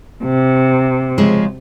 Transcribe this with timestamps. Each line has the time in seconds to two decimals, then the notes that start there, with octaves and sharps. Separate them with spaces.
0.24 C3
1.18 C#3 F3 G#3